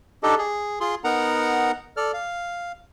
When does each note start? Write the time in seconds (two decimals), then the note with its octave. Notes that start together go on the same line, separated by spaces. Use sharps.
0.23 D4 D#4 G4 A4 D#5
0.38 G#4
0.81 F4 G#4 C6
1.04 B3 D#4 A#4 F#5 A#5
1.97 A4 D5 F6
2.14 F5